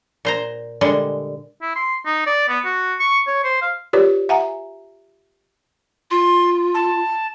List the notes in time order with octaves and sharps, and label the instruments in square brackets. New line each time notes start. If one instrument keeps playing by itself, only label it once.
[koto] A#2 C5 A#5
A#2 D3 G3 G#3
[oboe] E4
C6
D#4
D5
B3
F#4
C#6
C#5
C5
F5
[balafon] F4 G4 A#4 B4 C#5 D5
E5 F#5 G#5 A#5
[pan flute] F4 [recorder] C6
[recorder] A5